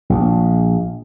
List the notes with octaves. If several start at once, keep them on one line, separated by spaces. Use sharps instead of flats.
A#1